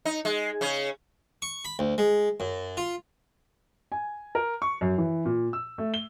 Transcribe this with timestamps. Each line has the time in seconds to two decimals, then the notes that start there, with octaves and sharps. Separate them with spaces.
0.05 D#4
0.25 G#3
0.61 C#3 C#4
1.42 C#6
1.65 B5
1.79 D2
1.98 G#3
2.40 F#2
2.77 F4
3.92 G#5
4.35 A#4
4.62 C#6
4.81 F#2
4.98 E3
5.25 A#2
5.53 E6
5.78 A3
5.94 G7